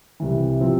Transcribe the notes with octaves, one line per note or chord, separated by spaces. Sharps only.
C2 C3 E3
C3 F3 C4